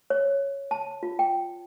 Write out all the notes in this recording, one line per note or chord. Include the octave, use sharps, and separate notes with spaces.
C#5
A5
F4
G5